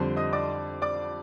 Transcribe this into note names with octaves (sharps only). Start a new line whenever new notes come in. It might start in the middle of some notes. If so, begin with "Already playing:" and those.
Already playing: F2 D3 G3 C5 C6
D#5 D#6
D5 D6
D5 D6